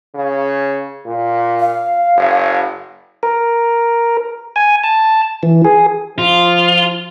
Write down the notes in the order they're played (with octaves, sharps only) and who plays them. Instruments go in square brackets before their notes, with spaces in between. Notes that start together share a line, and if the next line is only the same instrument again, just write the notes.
[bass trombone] C#3
A#2
[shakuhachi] F5
[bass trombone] F#1
[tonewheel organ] A#4
G#5
A5
E3
G#4
[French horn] F3 [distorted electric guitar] F4